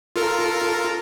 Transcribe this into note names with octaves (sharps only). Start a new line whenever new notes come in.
F4 A4 A#4